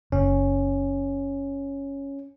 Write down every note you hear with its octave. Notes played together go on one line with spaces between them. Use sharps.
F#1 C#4